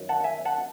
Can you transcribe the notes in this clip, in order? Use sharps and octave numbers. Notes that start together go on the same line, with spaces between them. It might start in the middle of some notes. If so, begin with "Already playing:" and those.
Already playing: F#2 D#3
F#5 A5
E5 G#5
F#5 A5